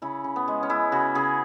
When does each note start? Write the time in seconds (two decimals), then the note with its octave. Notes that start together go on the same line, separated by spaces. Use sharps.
0.02 C#3 E4
0.24 C#3
0.36 B3
0.48 G#3
0.63 C#4
0.69 G#3 E4
0.92 C#3 F#4
1.15 C#3 G#4